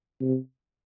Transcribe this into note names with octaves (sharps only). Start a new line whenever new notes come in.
C3